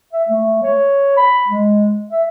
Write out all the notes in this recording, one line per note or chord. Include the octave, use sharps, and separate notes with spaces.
E5
A3
C#5
B5
G#3
E5